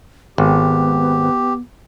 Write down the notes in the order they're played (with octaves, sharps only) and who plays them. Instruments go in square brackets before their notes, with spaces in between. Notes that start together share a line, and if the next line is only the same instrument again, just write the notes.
[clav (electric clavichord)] G#1 [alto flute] B3 [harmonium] G4